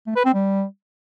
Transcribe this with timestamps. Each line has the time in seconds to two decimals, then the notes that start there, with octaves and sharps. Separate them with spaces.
0.07 A3
0.16 B4
0.25 C4
0.34 G3